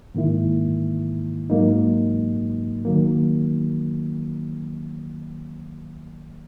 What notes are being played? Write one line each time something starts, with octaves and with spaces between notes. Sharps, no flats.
G#2 D#3 A#3 E4
G#2 F#3 A#3 D#4
D#3 F#3 A#3